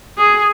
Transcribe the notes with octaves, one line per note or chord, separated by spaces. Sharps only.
G#4